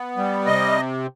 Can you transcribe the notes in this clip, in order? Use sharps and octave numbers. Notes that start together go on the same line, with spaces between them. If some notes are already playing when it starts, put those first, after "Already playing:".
Already playing: B3
G3
C3 D#5